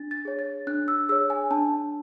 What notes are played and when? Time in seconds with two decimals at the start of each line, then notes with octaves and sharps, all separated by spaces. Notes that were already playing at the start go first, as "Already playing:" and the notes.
Already playing: D4 A6
0.11 A6
0.25 G#4 C#5
0.39 A6
0.67 D4 F#6
0.88 E6
1.09 G#4 C#5 E6
1.30 G#5
1.51 D4 A5